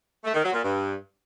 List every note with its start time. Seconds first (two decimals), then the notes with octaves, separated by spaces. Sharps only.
0.24 A3
0.34 D#3
0.44 F#3
0.53 A#2
0.63 G2